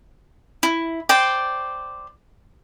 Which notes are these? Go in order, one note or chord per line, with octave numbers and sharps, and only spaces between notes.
E4
C5 D5 G5